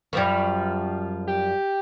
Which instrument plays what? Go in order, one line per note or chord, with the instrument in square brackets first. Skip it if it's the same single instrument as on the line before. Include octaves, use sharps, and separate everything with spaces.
[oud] F#2 F3 G3
[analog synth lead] G4